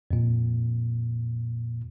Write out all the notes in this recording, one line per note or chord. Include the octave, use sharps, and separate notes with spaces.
F2 A#2